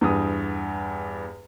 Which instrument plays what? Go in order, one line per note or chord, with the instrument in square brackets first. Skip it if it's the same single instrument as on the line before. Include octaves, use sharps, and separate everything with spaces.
[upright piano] E2 G2 D#6